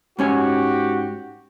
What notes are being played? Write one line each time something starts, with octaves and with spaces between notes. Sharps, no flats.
G#2 C#4 F#4 G4 G#5